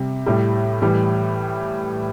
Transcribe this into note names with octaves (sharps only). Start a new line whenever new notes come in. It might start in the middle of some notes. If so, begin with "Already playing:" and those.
Already playing: C3 G3
A2 G3
A2 E3 G3